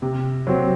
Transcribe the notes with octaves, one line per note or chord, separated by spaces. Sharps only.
C3
F#3 C4